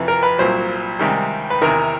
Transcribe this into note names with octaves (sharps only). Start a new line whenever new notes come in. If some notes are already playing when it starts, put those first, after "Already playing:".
Already playing: F2 C3 E3
A#4
B4
C2 A#2 F#3 C5
C#2 C3 D#3 G3
B4
E2 C3 D#3 A#4